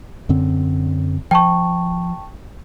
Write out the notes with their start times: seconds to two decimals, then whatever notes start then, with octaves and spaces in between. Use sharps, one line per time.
0.29 F#2 D3 C4
1.31 F3 G5 A5 C#6